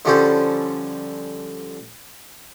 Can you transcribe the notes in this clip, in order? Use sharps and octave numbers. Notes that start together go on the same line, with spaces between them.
D3 F3 G3 C#4 A4 C5